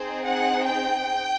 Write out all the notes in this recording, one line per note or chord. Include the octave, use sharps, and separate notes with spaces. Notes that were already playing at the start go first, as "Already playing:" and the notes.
Already playing: C4 D#4 G#4 C5
F#5
G5